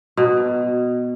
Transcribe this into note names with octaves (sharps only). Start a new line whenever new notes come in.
B2